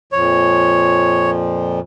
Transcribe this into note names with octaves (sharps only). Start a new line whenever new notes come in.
F2 A#2 F3 C#5